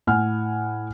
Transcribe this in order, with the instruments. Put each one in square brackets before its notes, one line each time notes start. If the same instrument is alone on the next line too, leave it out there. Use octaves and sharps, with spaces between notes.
[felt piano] A2 F#5 G#5 F6